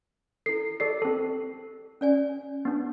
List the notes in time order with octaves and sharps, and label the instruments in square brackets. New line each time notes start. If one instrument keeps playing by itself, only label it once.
[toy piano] E4 A4 [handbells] C7
[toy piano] G4 [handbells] A4 D5 C7
[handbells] C4 A4
[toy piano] C#4 D5 G#5
[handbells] B3 D4